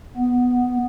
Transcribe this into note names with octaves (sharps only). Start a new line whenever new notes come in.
B3